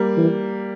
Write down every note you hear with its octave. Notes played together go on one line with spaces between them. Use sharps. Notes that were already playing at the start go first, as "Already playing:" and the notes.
Already playing: G3 A#3
E3